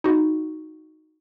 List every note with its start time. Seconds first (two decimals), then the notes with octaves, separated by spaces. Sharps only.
0.04 D#4 F#4